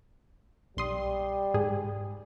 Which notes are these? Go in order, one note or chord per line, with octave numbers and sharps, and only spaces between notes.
B1 G3 C6 D#6
G#2 G#4